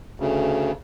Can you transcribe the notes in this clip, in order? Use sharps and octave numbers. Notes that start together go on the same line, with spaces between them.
D2 C#3